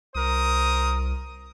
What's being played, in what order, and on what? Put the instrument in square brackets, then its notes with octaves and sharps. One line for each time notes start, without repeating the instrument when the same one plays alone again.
[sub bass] C2 [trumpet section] A#4 C5 D#6